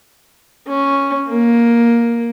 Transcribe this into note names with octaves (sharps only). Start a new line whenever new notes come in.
C#4
A#3